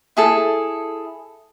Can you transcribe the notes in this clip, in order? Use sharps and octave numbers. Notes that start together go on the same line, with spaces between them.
E4 G#4 A4